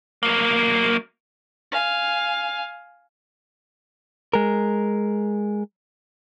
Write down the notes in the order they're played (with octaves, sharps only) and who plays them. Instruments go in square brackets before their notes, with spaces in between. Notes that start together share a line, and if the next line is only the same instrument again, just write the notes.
[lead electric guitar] F#3 A#3
[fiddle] F5 G#5
[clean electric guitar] G#3 A#4